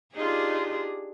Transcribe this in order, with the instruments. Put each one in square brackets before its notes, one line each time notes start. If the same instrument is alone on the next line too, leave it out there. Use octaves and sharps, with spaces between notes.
[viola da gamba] D4 G4 G#4 [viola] D#4 F4